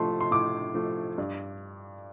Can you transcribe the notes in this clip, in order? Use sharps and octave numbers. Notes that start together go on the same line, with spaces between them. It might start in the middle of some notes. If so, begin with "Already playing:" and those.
Already playing: A2 F3 A3 A5 C6
C6
A2 D6
F3 A3
G2